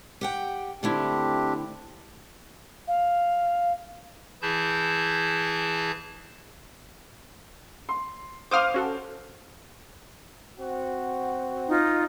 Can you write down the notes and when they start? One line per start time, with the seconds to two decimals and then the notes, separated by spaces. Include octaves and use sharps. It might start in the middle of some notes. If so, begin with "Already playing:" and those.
0.21 G4 F#5 G5
0.83 D3 A3 C4 D4 E4 G4
2.88 F5
4.42 E3 E4 G#4 A5 G6
7.89 C6
8.51 C5 F5 C6 D6 D#6 F6
8.74 C#4 F#4 A4
10.58 C4 F#4
11.69 D#4 F4 D#5